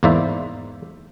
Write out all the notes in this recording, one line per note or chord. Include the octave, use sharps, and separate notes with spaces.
E2 G#2 A#3 C5 D5 E5